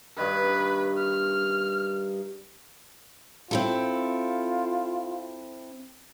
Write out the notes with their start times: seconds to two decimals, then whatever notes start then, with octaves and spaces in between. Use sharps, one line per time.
0.18 G2 D#3 B4
0.98 F6
3.51 C4 E4 F4 A4